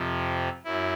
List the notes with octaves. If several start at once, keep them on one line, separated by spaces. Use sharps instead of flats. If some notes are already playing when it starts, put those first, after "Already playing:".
Already playing: F2 C3 F3
F#2 E4